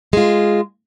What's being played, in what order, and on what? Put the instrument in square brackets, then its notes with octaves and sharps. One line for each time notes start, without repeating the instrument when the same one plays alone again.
[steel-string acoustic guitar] G#3 F4